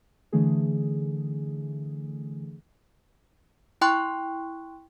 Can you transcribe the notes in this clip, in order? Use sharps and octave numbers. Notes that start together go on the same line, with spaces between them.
D3 E3 A3 G#4
E4 G5 C6 C#6 F#6